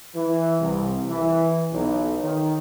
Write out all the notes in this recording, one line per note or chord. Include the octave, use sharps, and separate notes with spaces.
E3
C2
E3
B1
D#3